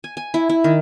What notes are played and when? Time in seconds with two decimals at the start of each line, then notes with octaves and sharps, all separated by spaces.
0.04 G#5
0.17 G#5
0.34 E4
0.49 E4
0.64 D#3